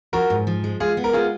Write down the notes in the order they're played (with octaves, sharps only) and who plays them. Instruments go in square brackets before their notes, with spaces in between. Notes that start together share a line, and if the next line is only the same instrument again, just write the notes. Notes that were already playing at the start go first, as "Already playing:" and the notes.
[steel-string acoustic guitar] F3 [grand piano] F#4 A#4
[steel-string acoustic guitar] G#2
F3
G#3
[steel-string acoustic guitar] G#3 [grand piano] F4 G#4
[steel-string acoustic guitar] B3
[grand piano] A#4
[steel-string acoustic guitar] G#3 [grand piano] F4 G#4